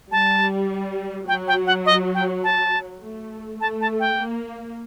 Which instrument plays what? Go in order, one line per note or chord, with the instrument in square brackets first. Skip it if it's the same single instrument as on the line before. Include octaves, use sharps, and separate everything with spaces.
[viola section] G3 [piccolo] A5
[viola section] F#3 [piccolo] G5
[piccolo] G5
F#5
D#5
G5
A5
[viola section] A3
[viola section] A3 [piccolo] A5
[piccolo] A5
G5
[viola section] A#3